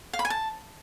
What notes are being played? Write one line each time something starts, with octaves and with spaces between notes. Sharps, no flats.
F5
B5
G#5
A5